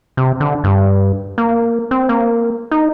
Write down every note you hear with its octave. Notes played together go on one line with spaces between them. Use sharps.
C3
D3
G2
A#3
C4
A#3
D#4